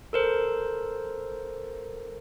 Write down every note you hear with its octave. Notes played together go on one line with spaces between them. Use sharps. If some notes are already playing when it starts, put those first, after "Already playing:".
A4 A#4 C5